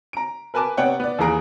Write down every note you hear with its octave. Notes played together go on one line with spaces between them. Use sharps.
A#5 D7
A#4 B4 G#5 A5 D6
C3 B3 C#5 D5 F#5 G5
B3 D5
D#2 E3 G#4 A#5 D7